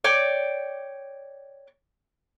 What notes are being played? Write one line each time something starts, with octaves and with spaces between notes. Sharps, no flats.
C#5 D5 G5 D6